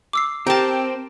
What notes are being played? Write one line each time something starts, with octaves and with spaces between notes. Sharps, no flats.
D6 E6 C7
C4 G4 A#4 A5